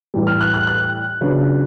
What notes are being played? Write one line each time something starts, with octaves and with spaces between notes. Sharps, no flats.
A2 E3 G3
F6
F#6
F#6
F#6
C#3 F#3 B3 D4 F4